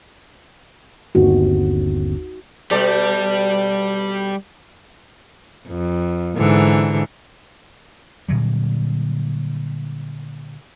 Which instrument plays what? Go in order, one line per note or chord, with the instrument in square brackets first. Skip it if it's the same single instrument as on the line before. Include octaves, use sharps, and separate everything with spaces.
[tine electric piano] G1 D#2 C4 [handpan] D#4 F#4
[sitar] B2 A4 D5 [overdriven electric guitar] G3
[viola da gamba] F2
G#2 D3 E3
[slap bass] A#2 D3 F#3 G3